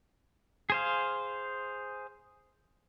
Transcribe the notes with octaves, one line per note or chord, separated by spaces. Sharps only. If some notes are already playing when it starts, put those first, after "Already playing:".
G#4 C5 F5